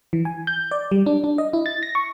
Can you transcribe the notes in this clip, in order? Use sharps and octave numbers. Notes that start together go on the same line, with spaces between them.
E3
G#5
G6
D5
G3
D4
D4
D#5
E4
A6
A#6
C#6